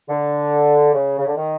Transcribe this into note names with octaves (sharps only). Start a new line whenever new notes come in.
D3
C#3
C#3
D3
D#3